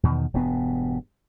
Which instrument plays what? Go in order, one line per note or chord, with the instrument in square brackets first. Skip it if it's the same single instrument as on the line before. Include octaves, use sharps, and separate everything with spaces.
[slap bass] E2 B2 D3 D#3
E1 G2 B2 B3